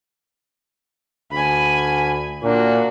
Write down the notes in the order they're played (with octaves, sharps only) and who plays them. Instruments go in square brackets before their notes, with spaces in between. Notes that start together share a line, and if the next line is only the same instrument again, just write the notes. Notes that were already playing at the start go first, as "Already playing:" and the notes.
[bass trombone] D2 [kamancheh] G#5 B5
[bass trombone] A#2 [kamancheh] D4 F#4